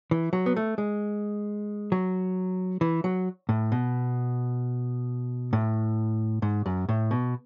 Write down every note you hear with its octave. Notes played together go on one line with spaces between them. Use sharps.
E3
F#3
B3
A3
G#3
F#3
E3
F#3
A2
B2
A2
G#2
F#2
A2
B2